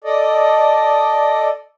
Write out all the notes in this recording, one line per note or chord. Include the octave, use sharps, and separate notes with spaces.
A4 D5 D#5